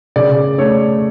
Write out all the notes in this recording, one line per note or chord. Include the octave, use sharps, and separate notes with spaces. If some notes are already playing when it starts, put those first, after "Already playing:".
C#3 D5
A3 C#5